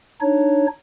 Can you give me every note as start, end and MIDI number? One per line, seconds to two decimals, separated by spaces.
0.21 0.67 62
0.21 0.67 63
0.21 0.67 73